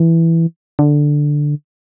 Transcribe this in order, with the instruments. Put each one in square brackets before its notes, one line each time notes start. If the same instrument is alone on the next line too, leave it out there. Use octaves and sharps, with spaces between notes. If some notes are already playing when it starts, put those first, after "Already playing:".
Already playing: [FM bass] E3
D3